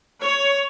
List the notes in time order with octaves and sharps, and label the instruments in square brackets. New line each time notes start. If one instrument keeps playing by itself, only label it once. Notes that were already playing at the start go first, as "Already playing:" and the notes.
[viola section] C#5